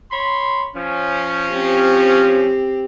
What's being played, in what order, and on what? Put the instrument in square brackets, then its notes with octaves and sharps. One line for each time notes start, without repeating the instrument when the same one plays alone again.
[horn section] C#5 B5 C6
F3 C#4
[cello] C4 G4